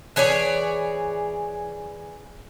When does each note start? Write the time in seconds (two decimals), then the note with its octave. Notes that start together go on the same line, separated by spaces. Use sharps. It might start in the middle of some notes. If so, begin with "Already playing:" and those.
0.16 E3 G#4 C#5 D5